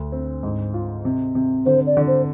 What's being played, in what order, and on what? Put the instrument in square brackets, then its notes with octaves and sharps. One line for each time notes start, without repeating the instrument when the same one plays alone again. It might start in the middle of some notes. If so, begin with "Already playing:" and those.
Already playing: [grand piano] D2
C4
G#2
F4
C3
C3
[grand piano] D3 [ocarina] C5
[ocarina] D5
[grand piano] D3
[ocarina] C5